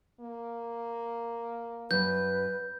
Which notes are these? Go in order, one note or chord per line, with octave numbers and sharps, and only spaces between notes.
A#3
F#2 B4 G6